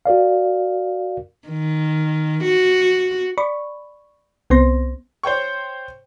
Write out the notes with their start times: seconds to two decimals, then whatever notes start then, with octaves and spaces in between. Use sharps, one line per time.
0.06 F#4 A#4 D5 F5
1.48 D#3
2.43 F#4
3.38 D5 B5 C#6
4.50 C2 B3 C4 C5 C6 A#6
5.23 C5 C#5 G5 C#6